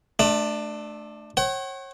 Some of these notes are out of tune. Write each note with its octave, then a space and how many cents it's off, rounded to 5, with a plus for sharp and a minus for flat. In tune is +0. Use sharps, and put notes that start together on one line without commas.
A3 -15 D4 +20
C#5 -35 F#5 +40